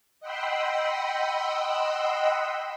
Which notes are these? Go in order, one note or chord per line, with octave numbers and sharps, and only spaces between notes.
D#5 F#5 G5 B5 C6 E6